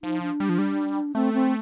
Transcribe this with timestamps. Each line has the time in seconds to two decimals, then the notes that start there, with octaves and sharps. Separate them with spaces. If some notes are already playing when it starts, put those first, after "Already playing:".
0.03 F3 D#4
0.22 D4
0.40 G3
0.49 F3
0.58 G3
1.15 A3 C4
1.34 C4